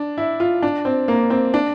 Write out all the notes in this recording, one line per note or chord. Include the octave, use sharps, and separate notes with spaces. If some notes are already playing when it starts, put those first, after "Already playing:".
Already playing: D4
E4
F4
D4
C4
A#3
C4
D4